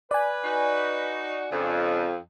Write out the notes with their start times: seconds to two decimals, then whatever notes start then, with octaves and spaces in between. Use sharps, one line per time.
0.11 B4 D5 G#5
0.43 D#4 F#4
1.51 F2 C#3 D4